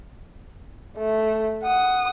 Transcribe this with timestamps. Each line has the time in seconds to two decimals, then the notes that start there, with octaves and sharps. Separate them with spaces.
0.98 A3
1.63 F#5 D#6